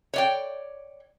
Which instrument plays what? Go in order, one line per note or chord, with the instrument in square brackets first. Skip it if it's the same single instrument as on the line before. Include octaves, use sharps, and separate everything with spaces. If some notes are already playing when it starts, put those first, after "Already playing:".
[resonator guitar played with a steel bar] C#5 D5 G5